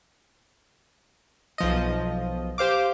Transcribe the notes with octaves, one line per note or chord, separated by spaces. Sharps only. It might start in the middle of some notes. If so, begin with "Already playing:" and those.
B1 F3 D#5
G4 C5 F5 D6